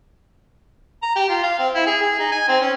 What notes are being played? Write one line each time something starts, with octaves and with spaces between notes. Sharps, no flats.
A#5
G4
F4
F5
C4
E4
G#4
G#4
D#4
G#5
C4
C#4